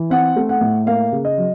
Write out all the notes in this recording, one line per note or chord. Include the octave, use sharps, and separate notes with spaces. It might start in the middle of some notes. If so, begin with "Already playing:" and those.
Already playing: E3
C4 F#5
A3
F#5
A2
A#3 F5
C#3
D#5
F#3